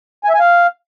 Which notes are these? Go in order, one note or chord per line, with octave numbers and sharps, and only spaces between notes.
G#5
E5
G#5
F5